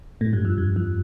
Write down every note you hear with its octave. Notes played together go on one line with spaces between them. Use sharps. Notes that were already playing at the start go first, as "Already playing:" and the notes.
A2
G2
F2
G2
F2